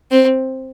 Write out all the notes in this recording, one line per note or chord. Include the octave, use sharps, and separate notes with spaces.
C4